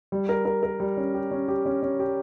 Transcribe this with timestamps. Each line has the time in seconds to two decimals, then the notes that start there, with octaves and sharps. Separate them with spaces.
0.12 G3
0.29 A#4
0.45 A#4
0.63 A#4
0.80 G3
0.97 C#4
1.14 G4
1.31 C#4
1.48 G4
1.65 C#4
1.83 C#4
2.00 G4